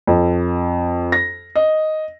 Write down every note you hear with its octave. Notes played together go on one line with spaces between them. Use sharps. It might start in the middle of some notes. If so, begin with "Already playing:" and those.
F2
A#6
D#5